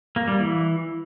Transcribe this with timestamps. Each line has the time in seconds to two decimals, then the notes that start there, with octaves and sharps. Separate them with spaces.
0.16 A#3
0.28 G3
0.39 E3